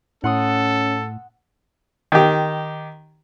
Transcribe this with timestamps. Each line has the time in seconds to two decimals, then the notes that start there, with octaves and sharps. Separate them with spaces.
0.24 A2 C#4 A4 F#5 C6 D#6
2.12 D#3 G4